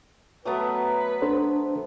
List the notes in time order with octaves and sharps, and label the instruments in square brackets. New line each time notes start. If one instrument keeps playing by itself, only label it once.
[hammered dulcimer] F#3 A3 B3 [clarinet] B4
[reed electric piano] D4 A4 C5